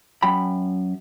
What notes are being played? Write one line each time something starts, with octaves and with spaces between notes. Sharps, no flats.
F#2 G5 B5